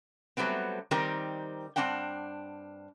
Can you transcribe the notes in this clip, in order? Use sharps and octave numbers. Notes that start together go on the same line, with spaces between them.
F#3 G3 A3 B3 C4
D#3 G3 C4 D#4 G4 A#4
G2 E3 C4 D4 F#5 G5